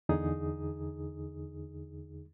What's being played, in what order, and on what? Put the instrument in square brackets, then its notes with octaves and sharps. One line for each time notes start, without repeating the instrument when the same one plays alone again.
[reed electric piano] E2 D3 D#4 G#4 D#6